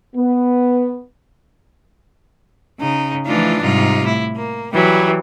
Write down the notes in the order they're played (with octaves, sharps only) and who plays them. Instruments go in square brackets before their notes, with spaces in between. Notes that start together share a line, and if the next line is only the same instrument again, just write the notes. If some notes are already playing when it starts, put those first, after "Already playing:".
[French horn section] B3
[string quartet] C#3 D#4
E3 F3 A3 D4 D#4 F4
G#2 C3 G3 D#4 F4
A2 E4
A#3
E3 F#3 G3